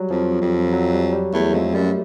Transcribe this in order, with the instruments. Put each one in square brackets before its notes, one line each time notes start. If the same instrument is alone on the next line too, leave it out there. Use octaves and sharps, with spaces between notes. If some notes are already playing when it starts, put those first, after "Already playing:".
Already playing: [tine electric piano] F#3 G3
[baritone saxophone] F2 [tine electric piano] F3
[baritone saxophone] F2
[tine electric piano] F#3
G3
G3
[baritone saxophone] E2 [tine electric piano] A3
[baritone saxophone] F2 [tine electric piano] G#3
[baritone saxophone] F#2 [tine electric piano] G3